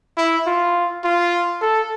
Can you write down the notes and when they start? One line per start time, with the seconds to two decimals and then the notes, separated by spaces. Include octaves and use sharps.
0.18 E4
0.47 F4
1.04 F4
1.62 A4